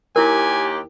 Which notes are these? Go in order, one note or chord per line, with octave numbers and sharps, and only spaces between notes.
D#2 E4 G4 A#4 G#5